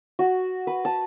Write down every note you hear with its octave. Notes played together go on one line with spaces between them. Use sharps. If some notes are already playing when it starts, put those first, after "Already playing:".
F#4
B4
A5